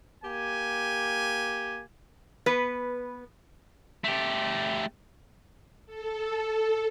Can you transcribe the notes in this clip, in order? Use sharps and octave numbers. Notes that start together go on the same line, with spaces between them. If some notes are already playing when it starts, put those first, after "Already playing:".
A#3 G4 G#5
B3 B4
A3 G4
A4